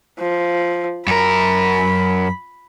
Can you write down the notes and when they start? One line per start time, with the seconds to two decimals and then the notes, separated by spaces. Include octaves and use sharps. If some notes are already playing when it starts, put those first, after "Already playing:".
0.19 F3
1.07 F#2 A#4 B5